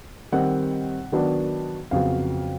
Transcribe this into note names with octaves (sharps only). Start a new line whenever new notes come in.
D#3 G3 C4 F#5
D#3 F#3 B3 D4
F2 C#3 F#3 B3 F5